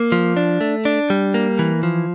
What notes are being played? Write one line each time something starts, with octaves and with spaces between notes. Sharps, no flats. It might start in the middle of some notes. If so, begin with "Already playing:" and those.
Already playing: A#3
F3
D4
A3
D4
G3
A#3
E3
F3